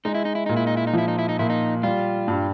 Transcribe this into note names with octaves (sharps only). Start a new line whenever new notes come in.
G#3 D#4
E4
D#4
E4
A#2 D#4
E4
D#4
E4
D#4
F3 E4
D#4
E4
D#4
A#2 E4
D#4
G3 F4
G2